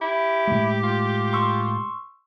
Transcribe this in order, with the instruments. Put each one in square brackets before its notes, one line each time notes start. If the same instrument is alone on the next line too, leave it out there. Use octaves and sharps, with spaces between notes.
[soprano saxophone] E4 [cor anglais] G4
[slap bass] A2 G#3
[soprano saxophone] F4
[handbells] C6 C#6 E6